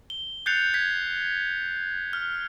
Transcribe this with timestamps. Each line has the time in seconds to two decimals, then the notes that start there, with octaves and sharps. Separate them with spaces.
0.10 G7
0.46 F#6 G6 A6 C7 C#7 F7
0.74 G#6 B6
2.13 F6